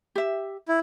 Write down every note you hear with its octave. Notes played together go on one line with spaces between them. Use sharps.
G4 E5
E4